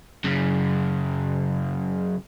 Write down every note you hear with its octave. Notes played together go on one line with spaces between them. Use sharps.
F#2 C#3